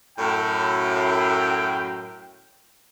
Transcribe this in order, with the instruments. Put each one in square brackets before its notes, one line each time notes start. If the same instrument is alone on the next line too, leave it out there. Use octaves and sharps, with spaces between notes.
[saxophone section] F#2 A2 [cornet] G5